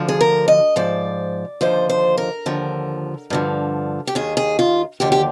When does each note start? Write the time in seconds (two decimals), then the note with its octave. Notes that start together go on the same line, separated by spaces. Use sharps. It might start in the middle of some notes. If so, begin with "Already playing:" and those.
Already playing: D2 D3 F3
0.09 G#4
0.21 A#4
0.48 D#5
0.76 G#2 F3 D5
1.61 D#2 D3 F3 C5
1.89 C5
2.18 A#4
2.46 D#2 D3 F3
3.30 G2 D3 F3
4.07 G4
4.15 D#2 D#3 G#4
4.37 G#4
4.59 F4
5.00 D#2 D3 F3 G4
5.12 G4